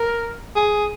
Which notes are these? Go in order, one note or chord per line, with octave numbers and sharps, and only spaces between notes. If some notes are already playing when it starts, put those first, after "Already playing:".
Already playing: A#4
G#4